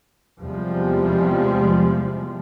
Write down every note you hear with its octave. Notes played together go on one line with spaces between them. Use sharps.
E2 C3 F3 G3 G#3